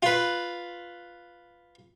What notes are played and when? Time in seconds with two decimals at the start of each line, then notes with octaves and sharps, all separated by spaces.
0.03 F4 B4